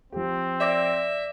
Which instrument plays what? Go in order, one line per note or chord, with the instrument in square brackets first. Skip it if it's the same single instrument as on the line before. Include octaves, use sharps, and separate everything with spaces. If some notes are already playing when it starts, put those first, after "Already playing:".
[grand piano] F3 G4 [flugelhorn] C4
[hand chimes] D5 D6 A#6 [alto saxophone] E5